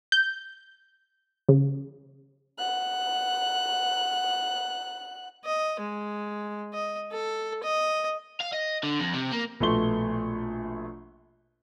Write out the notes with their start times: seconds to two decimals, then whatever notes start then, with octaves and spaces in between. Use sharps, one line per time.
0.12 G6
1.49 C#3
2.59 F#5 F#6
5.45 D#5
5.80 G#3
6.73 D#5
7.12 A4
7.63 D#5
8.40 F5
8.52 D#5
8.83 D3
9.00 F2
9.14 C3
9.32 A#3
9.60 A#1 B2 A3 C6 C#6 G7